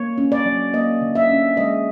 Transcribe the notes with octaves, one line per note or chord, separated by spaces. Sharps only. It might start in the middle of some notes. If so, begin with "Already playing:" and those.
Already playing: A#3 C#5
C#4
D5
F#3
A#3 D#5
D3
E5
C#4
G#3 D#5